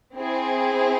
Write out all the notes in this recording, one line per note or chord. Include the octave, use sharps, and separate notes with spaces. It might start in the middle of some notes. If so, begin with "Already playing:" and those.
C4 E4 G#4